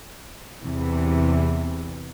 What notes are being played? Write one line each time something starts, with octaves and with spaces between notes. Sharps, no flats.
E2 C3 E3